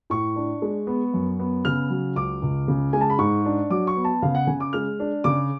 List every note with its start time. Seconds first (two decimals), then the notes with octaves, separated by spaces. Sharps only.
0.10 A2 C#6
0.36 D4
0.62 G#3
0.87 B3
1.14 F#2
1.39 B3
1.65 C#3 F6
1.90 F#3
2.16 C#2 D6
2.42 C#2
2.68 C#3
2.93 G#3 G#5
3.01 A5
3.10 B5
3.19 G#2 C#6
3.45 D4
3.70 F#3 D6
3.87 C#6
3.97 B3
4.04 A5
4.22 C#3 F5
4.35 F#5
4.47 C#3 G#5
4.60 D6
4.73 G#3 F6
5.00 D4
5.24 C#3 D6